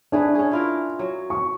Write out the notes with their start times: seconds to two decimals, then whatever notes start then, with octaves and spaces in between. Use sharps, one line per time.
0.12 A3 D4 G#4 B4
0.35 C#4 G#4
0.51 E4 F4 A#4
0.99 F#3
1.30 C#6